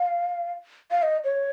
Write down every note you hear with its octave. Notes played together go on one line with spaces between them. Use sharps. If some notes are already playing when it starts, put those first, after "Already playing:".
Already playing: F5
F5
D#5
C#5